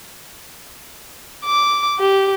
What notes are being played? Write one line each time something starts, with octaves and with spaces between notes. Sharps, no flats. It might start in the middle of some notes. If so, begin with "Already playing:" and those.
D6
G4